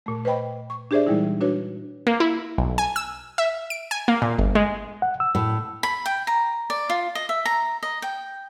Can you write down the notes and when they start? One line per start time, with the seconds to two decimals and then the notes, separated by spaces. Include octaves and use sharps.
0.06 A#2 A3
0.25 B4 C5 D#5 G5 B5
0.70 C#6
0.91 D4 G4 G#4 C5 D5 E5
1.06 A#2 E3 G3 G#3 D#4 E4
1.41 D4 F#4 B4 C#5
2.07 A#3
2.20 E4
2.58 B1
2.78 G#5
2.96 E6
3.38 E5
3.70 D7
3.91 G#5
4.08 A#3
4.22 A#2
4.39 G1
4.55 G#3
5.02 F#5
5.20 E6
5.35 A2
5.83 B5
6.06 G5
6.27 A#5
6.70 D5
6.90 F4
7.15 D#5
7.29 E5
7.45 A#5
7.83 D#5
8.02 G5